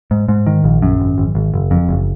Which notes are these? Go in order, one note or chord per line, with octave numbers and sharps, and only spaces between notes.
G#2
G#2
D#3
A#1
F#2
G#1
G#1
G#1
F#1
F2
F#1